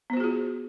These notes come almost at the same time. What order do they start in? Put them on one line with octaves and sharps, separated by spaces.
B3 C5 F#4 G#4 F4